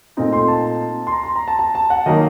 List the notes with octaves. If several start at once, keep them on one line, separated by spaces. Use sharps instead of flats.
A#2 A3 C4 D#4
C6
A5
C6
A#5
C6
A#5
A5
A5
A5
F#5
D#3 F#3 A#3 D#4 D#5